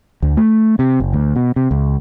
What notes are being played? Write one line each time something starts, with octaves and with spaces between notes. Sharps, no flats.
D2
A3
C3
F#1
D2
B2
C3
C#2